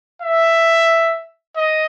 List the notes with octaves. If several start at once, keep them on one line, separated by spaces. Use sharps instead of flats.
E5
D#5